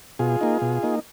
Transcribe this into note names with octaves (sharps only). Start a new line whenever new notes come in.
B2 F4 G#4
A#3 D#4
B2
A#3 D#4